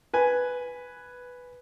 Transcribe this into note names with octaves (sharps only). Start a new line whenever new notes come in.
B4 G#5